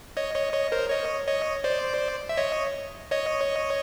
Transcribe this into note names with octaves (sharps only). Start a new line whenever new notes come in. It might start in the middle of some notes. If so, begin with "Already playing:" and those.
C#5 D#5
C#5 D#5
C#5 D#5
A#4 C5
C#5 D#5
C#5 D#5
C5 D5
E5
C#5 D#5
C#5 D#5